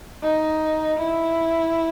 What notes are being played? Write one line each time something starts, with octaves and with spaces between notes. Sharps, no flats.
D#4
E4